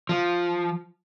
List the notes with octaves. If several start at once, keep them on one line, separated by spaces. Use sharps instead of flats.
F3